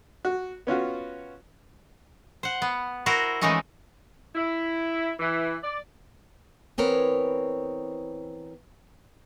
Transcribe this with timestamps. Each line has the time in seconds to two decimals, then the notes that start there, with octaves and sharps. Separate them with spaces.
0.25 F#4
0.67 B3 C#4 F4 F#4
2.43 C5 F#5
2.62 B3
3.06 E4 F#4 A#4 C5
3.41 E3 F3 G#3 A3 C#4 D#4
4.35 E4
5.19 E3
5.62 D5
6.78 E3 B3 C4 A#4 C#5